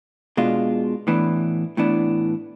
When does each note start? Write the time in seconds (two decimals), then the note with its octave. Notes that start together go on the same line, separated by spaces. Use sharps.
0.37 B2 G#3 D4 F4
1.07 A2 E3 B3 D4
1.77 A2 E3 B3 D4